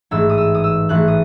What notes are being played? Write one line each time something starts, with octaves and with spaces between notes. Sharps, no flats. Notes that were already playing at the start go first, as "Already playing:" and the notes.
A1 G#2 E3 E6
D#6
E6
D#6
E6
A1 G#2 E3 F#6
D#6